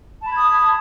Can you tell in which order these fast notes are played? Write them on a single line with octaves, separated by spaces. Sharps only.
A5 B5 G#6 D#6